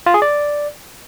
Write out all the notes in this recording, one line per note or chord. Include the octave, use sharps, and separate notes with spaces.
F4
G#4
D5